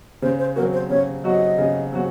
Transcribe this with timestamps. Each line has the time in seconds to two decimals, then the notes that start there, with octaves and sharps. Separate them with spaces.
0.22 C#3 C5
0.39 C5
0.56 F#3 C4 F#4 A#4
0.73 C5
0.90 C#3 C#5
1.24 F#3 C4 F#4 D#5
1.58 C#3
1.92 F#3 C4 F#4